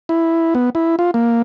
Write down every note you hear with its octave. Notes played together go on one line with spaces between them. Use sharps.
E4
B3
E4
F4
A#3